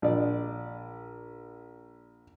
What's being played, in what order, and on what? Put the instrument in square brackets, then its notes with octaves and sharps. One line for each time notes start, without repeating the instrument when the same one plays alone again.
[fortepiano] A#1 D5